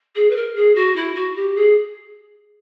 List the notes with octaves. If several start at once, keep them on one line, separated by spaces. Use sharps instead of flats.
G#4
B4
A#4
G#4
F#4
E4
F#4
G4
G#4